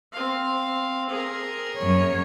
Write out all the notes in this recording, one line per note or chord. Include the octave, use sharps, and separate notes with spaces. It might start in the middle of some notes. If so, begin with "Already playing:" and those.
C4 F5
G#4 A#4
F#2 C#5